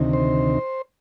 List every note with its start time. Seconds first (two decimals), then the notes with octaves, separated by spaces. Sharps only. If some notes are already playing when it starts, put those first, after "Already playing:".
Already playing: D2 C3 D#3
0.13 C5